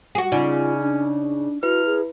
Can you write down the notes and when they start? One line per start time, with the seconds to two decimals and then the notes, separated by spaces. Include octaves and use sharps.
0.15 F#4 G#4
0.32 C#3 C#4 D#4 F4 D5
0.80 D4
1.63 E4 F#4 B4 F6
1.86 G#4